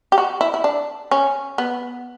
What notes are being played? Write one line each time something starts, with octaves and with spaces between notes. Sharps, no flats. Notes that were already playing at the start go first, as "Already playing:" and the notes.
G4
F#4
E4
E4
D4
C#4
B3